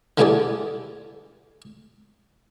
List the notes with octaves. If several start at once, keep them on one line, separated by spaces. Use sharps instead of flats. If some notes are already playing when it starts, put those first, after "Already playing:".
D3 G3 B3 E4 G#4 D5